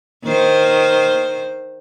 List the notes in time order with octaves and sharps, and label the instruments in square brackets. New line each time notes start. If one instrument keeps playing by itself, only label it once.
[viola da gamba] D#3 C5